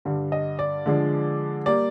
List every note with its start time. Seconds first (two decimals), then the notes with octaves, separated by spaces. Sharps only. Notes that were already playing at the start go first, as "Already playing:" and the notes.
0.05 G2 D3 G3
0.32 D#5
0.59 D5
0.86 D3 F3 G#3 D4
1.66 G3 A#3 D5